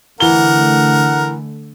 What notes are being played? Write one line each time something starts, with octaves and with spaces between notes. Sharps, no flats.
D3 E3 A3 A#4 F#5 G7